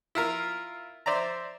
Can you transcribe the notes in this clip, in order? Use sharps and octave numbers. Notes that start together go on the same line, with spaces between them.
E4 F4 A#4 F5
C5 D5 E5 A#5